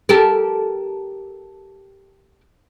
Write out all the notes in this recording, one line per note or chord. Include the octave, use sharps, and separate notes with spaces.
G4 A4 A#4